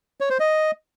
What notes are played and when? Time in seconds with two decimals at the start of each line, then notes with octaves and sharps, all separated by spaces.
0.21 C#5
0.30 C5
0.40 D#5